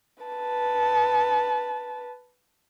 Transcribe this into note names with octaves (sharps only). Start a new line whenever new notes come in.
B4 A5